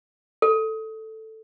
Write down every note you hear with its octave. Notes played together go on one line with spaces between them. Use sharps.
A4